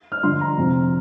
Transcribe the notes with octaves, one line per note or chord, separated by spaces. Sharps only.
F6
G2 D3 F3 C6
A#5
F2 C3 F3